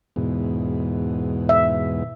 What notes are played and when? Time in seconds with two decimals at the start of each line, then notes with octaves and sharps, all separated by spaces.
0.16 E2 G#2 B2
1.49 E5